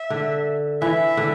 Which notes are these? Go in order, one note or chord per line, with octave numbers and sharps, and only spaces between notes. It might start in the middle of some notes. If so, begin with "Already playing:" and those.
Already playing: E5
D3
E3 E5
D3